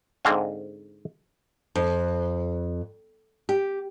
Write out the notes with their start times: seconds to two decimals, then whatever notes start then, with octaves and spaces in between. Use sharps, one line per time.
0.25 G#2 D3 C4 F5 G#5
1.75 F2
3.49 G4